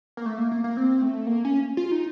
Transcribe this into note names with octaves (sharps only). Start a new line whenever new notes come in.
A#3
A3
A#3
A#3
A#3
C4
A3
A#3
C#4
F4
D#4